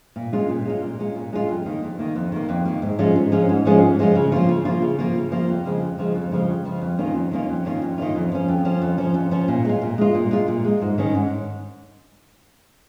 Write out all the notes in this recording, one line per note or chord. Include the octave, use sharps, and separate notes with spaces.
A#2
G#3 C#4 F4
A#2
G#3 C#4 F4
A#2
G#3 C#4 F4
A#2
G#3 C#4 F4
F2
D#3 A#3
F2
D#3 A#3
F2
D#3 A#3
F2
D#3 A#3
G#2
F3 G#3 C#4 F4
G#2
F3 G#3 C#4 F4
G#2
F3 G#3 C#4 F4
G#2
F3 G#3 C#4 F4
C#3
F3 A#3 F4
C#3
F3 A#3 F4
C#3
F3 A#3 F4
C#3
F3 A#3 F4
F2
C#3 F3 G#3
F2
C#3 F3 G#3
F2
C#3 F3 G#3
F2
C#3 F3 G#3
F2
D#3 A#3 C#4 F4
F2
D#3 A#3 C#4 F4
F2
D#3 A#3 C#4 F4
F2
D#3 A#3 C#4 F4
F2
F3 C#4
F2
F3 C#4
F2
F3 C#4
F2
F3 C#4
A#2
G#3 F4
A#2
G#3 F4
A#2
G#3 F4
A#2
G#3 F4
G#2
D#3 C#4
G#2